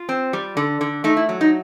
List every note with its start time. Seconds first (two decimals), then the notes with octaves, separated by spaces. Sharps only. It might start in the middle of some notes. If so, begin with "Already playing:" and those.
Already playing: F4
0.09 C4
0.33 G3
0.57 D3
0.81 D3
1.04 A3 D#4
1.17 E4
1.29 F#3
1.41 D#4